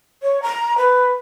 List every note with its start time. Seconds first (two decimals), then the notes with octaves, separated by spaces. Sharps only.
0.22 C#5
0.42 A#5
0.78 B4